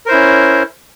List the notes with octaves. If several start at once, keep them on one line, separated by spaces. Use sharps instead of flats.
C#4 E4 A#4 C5